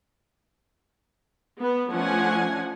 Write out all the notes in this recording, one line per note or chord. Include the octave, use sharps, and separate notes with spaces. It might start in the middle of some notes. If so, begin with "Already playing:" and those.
B3
F3 A3 C#4 D4 F#5 G#5